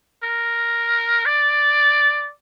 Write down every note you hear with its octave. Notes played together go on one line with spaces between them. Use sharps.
A#4
D5